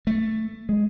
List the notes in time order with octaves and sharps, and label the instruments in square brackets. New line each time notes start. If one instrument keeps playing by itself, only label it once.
[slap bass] A3
G#3